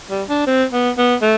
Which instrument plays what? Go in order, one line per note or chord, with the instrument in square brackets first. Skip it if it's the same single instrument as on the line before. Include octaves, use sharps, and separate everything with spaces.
[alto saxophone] G3
D4
C4
B3
B3
A3